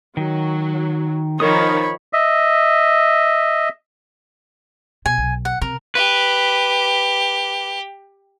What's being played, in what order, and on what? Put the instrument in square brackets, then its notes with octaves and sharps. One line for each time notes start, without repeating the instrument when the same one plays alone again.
[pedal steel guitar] D#3 [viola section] F#3
[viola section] D#3 F3 D#4 [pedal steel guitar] A#4 D#6 [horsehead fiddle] C#5 B5
[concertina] D#5 E5
[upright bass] B2 [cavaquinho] G#5
[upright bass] B1
[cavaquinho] F#5
[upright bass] C3 [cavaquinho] A#4
[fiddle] G4 [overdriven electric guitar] B4